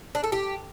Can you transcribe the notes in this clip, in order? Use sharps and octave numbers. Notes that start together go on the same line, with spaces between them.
D4
A4
G4